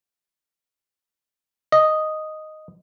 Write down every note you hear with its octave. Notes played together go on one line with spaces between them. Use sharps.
D#5